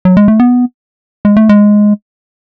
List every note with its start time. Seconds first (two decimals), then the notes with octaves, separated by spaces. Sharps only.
0.05 F#3
0.17 G#3
0.28 A3
0.40 B3
1.25 G#3
1.37 A3
1.49 G#3